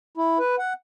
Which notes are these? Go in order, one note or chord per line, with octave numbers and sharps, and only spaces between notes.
E4
B4
F#5